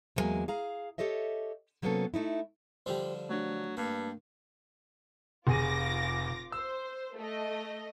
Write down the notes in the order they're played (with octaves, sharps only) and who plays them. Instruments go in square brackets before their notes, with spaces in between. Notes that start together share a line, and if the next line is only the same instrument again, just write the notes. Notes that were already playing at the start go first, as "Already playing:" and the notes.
[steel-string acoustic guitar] E2 A#2 F#3 G#3 A#3 G#5
G#4 F5 A#5
G4 A4 C#5 D#5 E5
C3 F#3 A#3 B3 C#4 A4
A3 D#4 E4
[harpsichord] D3 F3 G3 [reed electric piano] G4 C5
[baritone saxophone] F#3 [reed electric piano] A3 D4
[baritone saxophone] G2 [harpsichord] A#3
[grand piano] F1 G#4 D#7 [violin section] F4 D6 A#6
[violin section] C5 [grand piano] E6
[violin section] A3 D#5